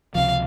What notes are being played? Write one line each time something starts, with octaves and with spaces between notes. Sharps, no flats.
C#2 C3 F3 F5